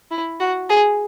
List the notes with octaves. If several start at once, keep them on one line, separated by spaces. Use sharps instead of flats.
E4
F#4
G#4